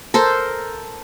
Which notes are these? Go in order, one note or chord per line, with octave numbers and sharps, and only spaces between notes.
A4 A#4 C5